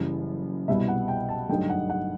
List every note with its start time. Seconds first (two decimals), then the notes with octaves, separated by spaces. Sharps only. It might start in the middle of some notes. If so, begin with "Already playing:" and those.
Already playing: F#1 F#2 E3 G3
0.68 C2 B2 G3 B3 E4 E5
0.88 F#5
1.08 G5
1.29 A5
1.49 G1 G2 F#3 A3 D#4 G5
1.70 F#5
1.90 F#5